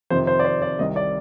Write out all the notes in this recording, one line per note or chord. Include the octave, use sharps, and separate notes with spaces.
F2 C3 D#3 C5
C5
D5
C5
D5
C2 C3 D#3 D#5
D5